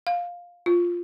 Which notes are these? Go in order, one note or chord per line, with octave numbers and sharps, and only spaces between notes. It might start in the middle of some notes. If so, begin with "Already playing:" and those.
F5
F4